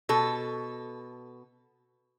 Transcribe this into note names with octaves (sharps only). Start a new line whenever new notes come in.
B2 A4